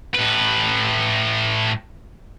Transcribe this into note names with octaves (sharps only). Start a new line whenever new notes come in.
A2 B4